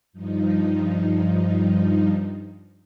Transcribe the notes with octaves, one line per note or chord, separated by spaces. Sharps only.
G2 F3 D#4